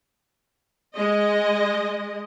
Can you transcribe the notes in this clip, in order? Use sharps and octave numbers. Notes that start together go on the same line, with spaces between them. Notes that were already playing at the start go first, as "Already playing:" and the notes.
G#3 D#5